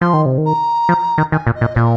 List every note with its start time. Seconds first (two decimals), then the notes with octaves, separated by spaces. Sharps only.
0.01 F3 C6
0.13 D#3
0.26 C3
0.38 D#3
0.45 A#5
0.89 F3
1.18 D#3
1.32 D#3 G#5
1.47 A#2
1.55 D#5
1.61 A#2
1.75 A#2 A#4